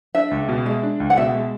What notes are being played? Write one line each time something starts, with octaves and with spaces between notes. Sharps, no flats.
D4 E5
C#2
B2
G#3 E5
D4
C#2
F#5
B2 E5
G#3